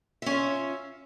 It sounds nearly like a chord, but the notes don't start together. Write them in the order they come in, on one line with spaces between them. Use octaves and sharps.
E5 C#4 F4